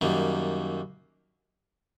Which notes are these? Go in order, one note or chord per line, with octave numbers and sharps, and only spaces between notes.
F#2 D#3 G3 A#3